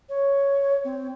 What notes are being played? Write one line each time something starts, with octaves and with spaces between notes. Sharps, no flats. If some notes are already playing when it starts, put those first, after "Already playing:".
C#5
C4